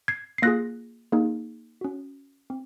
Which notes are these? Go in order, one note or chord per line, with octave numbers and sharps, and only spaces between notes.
G#6 C7
C7
A#3 F4 G#4 F#6 A#6
A#3 D#4 G#4
C#4 F#4
C4